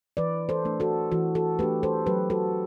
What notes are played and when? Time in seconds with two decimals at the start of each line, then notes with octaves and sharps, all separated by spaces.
0.17 E3 B4 D5
0.49 A4 C5
0.65 A3 D4
0.80 F#4 A4
1.12 E3 F#4
1.35 F#4 A4
1.59 A3 D4 G4 B4
1.83 A4 C5
2.06 F#3 G4 B4
2.30 F#4 A4